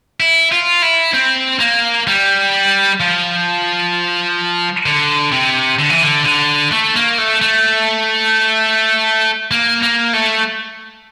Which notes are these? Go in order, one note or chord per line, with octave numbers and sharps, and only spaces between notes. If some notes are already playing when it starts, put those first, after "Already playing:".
E4
F4
E4
C4
A#3
G3
F3
D3
C3
D3
E3
D3
D3
A3
A#3
A3
A3
A#3
A#3
A3